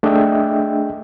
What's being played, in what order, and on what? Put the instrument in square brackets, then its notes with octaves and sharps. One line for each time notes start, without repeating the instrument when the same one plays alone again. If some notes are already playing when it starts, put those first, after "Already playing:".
[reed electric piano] A3 D4 G#4 D#5 E5 G5